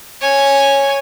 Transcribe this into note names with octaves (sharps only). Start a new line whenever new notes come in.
C#5 G#5